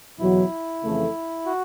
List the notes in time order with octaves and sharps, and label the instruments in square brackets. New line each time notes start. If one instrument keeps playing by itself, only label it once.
[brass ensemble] E2 B2 F#3 [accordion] E4
[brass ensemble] F2 C#3 E3 A3
[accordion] F#4